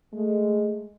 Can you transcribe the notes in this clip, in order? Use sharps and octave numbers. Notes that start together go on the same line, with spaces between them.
G#3 A3